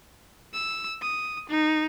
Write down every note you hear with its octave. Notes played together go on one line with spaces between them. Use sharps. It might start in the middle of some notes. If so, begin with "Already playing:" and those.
E6
D#6
D#4